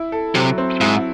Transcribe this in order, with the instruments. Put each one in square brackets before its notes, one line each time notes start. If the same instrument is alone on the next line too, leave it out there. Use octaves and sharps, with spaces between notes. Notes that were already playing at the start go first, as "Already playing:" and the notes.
Already playing: [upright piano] E4
A4
[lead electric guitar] C3 [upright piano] F#3
[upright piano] C4
[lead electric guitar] G#2 [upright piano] E4